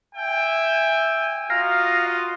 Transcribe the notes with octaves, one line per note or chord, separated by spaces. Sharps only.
E5 G5 G#5
F4 F#4 D#5 F5 A#5